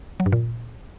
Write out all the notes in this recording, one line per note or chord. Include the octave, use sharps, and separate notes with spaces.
F#3
G2
A#2